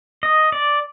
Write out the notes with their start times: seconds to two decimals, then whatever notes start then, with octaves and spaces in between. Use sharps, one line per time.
0.23 D#5
0.52 D5